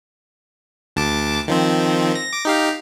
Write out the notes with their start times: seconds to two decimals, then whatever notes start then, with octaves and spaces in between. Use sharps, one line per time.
0.96 D2 A5 D6
1.48 D#3 F3 C4
2.15 A#6
2.33 D6 A#6
2.45 D#4 G4 F5